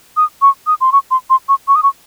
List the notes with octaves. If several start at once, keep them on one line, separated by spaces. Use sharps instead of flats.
D#6
C#6
D#6
C6
C#6
C6
C6
C#6
C#6
D#6
C#6